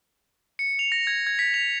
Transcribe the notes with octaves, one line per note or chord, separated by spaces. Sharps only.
C#7
F7
A#6
G#6
G#6
B6
F7